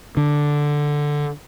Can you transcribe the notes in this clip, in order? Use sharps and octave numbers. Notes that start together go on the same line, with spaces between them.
D3